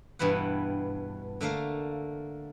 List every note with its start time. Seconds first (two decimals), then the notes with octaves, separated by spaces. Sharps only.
0.19 G2 B2 E3 B4 F#5
1.41 D3 A3 A#3 F5